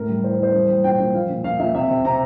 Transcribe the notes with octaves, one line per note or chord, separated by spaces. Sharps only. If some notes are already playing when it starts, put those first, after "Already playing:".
Already playing: A2 A#4
G3
E3 C5
A#4
E3 C5
G3
G3
A#2 G5
A#2
F3 F5
A#2
A#2 F5
A#2 E5
C3 E5
C3
C3 A#5